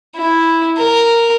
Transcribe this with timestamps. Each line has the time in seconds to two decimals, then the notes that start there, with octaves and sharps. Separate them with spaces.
0.17 E4
0.78 A#4